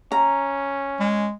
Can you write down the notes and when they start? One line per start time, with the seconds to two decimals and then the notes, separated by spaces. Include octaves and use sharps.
0.12 C#4 A#5
1.00 G#3